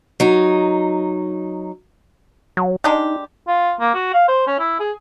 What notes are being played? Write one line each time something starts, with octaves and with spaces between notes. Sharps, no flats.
F#3 D#4
F#3
G#3 D4 D#4 G4
F4
A#3
F#4
F5
C5
C#4
E4
G#4